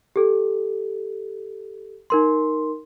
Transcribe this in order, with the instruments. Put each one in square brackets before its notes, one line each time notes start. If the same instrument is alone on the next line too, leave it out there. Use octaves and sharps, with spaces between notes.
[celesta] G4 A4
D#4 A#4 C6